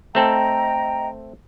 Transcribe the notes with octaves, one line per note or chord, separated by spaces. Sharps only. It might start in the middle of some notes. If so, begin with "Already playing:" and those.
A3 C4 A4 D#5 G5 A#5